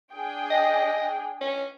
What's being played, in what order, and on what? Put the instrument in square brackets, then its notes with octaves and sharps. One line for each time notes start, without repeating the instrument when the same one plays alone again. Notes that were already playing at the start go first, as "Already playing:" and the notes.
[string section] D4 G#4 G5
[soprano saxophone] D#5
C#4